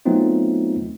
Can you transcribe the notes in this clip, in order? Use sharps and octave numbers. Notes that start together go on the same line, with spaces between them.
F#3 A3 B3 C4 D#4 F4